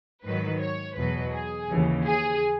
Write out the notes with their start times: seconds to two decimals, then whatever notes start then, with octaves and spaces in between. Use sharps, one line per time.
0.24 G#2 D#3 F#3 B4
0.60 C#5
0.96 E2 B2 F#3 B4
1.33 G#4
1.69 D#2 C#3 E3
2.05 G#4